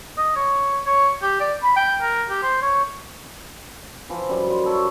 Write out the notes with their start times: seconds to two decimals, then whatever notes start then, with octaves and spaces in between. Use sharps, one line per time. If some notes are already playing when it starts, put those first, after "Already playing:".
0.18 D#5
0.36 C#5
0.86 C#5
1.22 G4
1.40 D5
1.63 B5
1.76 G5
2.02 A#4
2.29 G4
2.43 C5
2.62 C#5
4.10 E3 F3
4.29 F#2 G3
4.50 C6
4.66 A4 C#5